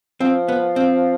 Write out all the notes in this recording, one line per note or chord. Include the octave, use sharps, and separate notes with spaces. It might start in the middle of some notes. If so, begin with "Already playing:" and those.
F3 C4
B3
C4